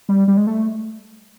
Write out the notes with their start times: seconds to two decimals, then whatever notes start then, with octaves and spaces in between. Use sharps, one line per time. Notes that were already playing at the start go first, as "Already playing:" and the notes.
0.09 G3
0.28 G3
0.37 G#3
0.47 A3